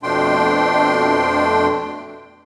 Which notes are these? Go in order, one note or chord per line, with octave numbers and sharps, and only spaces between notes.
F2 B2 A3 D4 G5 C6